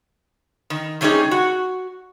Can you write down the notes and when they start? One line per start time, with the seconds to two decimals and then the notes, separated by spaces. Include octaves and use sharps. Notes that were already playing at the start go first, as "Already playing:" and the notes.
0.70 D#3
1.01 C3 G3 C#4 D#4 G#4
1.31 F#4